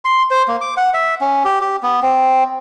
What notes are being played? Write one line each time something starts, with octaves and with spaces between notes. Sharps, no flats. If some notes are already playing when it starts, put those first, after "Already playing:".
C6
C5
A#3
D6
F#5
E5
C#4
G4
G4
B3
C4